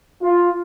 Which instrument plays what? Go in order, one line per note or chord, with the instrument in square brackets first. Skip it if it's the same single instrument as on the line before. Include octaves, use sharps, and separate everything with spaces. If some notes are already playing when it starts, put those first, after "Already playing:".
[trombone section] F4